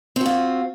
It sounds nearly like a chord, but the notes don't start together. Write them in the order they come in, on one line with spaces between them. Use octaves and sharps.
C4 F#4 F4